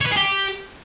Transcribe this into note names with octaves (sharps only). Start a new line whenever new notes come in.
C#5
B4
G#4
G4